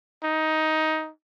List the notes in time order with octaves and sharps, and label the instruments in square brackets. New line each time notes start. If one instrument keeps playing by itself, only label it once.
[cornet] D#4